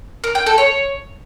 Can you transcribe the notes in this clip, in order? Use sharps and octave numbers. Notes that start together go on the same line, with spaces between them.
A#4
G5
A4
C#5